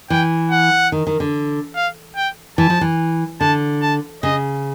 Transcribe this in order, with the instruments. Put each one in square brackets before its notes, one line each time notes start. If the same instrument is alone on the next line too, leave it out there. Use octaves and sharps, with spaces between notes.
[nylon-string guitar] E3 [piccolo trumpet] G5
[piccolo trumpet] F#5
[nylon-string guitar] D#3
D#3
D3
[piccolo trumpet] F5
G5
[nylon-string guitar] E3 [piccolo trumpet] A5
[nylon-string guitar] F3
E3
[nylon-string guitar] D3 [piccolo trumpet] A5
[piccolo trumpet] A5
[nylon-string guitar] C#3 [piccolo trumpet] D#5